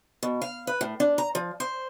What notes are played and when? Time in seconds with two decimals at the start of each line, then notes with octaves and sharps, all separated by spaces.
0.23 B2
0.42 F5
0.67 B4
0.81 A2
1.00 D4
1.18 A#5
1.35 F3
1.60 C5